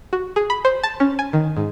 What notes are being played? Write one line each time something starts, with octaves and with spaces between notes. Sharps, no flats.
F#4
G#4
B5
C5
A5
C#4
G#5
D#3
G#2